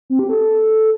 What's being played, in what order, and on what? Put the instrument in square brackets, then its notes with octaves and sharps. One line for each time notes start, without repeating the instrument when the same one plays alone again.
[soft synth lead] C4
G4
A4